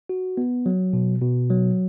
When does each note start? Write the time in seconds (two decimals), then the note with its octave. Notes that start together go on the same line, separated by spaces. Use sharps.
0.09 F#4
0.37 B3
0.66 F#3
0.93 B2
1.22 B2
1.50 F#3